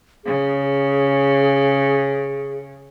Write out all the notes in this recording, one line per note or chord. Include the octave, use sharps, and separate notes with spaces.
C#3 G#4